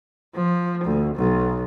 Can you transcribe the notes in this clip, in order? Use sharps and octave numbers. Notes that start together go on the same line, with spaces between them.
F3
D2
B1